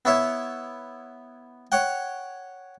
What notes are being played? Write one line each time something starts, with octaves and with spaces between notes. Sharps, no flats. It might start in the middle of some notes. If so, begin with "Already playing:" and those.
B3 E4 C#5 E5
C#5 F#5 G5